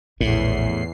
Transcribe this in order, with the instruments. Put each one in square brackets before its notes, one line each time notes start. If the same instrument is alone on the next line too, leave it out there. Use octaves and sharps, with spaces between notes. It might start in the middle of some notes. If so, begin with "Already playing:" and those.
[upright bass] A#1 [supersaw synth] E2 C7 [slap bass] A2